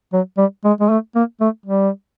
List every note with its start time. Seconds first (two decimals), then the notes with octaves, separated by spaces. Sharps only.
0.13 F#3
0.38 G3
0.65 G#3
0.80 G#3
0.90 A3
1.15 A#3
1.41 A3
1.66 G3